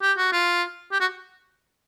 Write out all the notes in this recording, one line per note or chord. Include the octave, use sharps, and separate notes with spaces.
G4
F#4
F4
G4
F#4